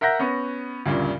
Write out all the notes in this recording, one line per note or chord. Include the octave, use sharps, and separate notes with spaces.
A#4 E5 F#5 G6 A#6
B3 C#4
D2 G2 A#2 C#3